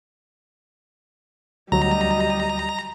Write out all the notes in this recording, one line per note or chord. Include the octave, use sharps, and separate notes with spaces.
D2 F#3 G3 D#5 A#5